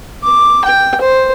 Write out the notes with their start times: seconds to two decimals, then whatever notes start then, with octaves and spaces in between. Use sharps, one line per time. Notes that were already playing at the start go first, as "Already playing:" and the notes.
0.23 D6
0.65 G5
1.01 C5